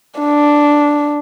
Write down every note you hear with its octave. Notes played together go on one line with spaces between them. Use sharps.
D4